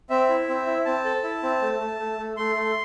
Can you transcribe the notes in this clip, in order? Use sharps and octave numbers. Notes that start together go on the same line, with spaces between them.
C4 E5
E4
C4
E4
C4 A5
A4
E4
C4
A3
A3
A3
A3
A3 C6
A3